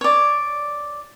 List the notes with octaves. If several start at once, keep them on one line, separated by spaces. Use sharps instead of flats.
C#5 D5